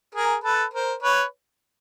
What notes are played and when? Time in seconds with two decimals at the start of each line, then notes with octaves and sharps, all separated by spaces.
0.15 G#4 A#4
0.44 A4 B4
0.74 A#4 C5
1.03 B4 C#5